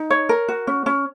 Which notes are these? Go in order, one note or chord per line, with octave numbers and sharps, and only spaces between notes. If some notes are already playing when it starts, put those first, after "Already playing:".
Already playing: D#4
C#5
A#4
F#4
C#4
C#4